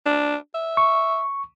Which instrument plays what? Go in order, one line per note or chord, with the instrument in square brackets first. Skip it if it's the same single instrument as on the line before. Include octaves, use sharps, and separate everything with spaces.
[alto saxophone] D4
E5
[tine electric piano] C#6